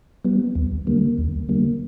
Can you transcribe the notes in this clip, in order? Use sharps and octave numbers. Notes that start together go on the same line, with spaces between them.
G3 B3
D#2
D3 G3 A#3
D#2
D3 G3 A#3